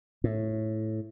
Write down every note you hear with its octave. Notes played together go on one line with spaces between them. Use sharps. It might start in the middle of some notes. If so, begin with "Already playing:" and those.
A2